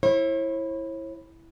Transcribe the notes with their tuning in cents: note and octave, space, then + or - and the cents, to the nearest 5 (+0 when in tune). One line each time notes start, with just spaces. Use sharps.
E4 +0 C#5 -45